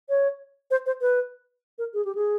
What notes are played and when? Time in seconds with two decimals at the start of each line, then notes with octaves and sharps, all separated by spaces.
0.09 C#5
0.71 C5
0.86 C5
1.01 B4
1.78 A#4
1.94 G#4
2.05 G4
2.15 G#4